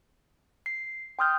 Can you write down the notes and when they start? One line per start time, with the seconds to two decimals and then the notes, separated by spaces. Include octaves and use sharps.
0.66 C7
1.19 G5 C6 D#6 F6 G6